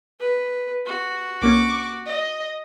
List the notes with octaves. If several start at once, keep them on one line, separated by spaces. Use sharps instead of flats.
B4
F#4
C2 A#3 C#4 C#6 D6
D#5